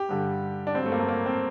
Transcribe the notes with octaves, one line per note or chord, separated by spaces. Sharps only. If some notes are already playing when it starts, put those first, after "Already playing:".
Already playing: G4
G2 D3 G3
D4
G2 F#3 C4
A3
A#3
A3
A#3
C4